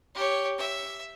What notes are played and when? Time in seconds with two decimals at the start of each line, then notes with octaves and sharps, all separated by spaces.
0.15 G4 C#5
0.58 E5